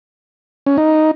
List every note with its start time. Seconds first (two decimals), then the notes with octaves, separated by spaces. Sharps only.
0.67 C#4
0.77 D#4